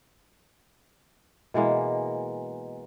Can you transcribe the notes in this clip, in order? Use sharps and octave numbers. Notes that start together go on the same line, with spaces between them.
B2 E3 G#3 A#3